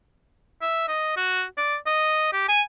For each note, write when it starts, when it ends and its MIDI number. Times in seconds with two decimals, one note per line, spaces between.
0.62 0.84 76
0.88 1.12 75
1.17 1.43 66
1.58 1.76 74
1.87 2.29 75
2.33 2.47 67
2.48 2.62 80